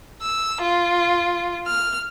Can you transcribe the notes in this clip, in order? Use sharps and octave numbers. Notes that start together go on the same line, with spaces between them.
E6
F4
F6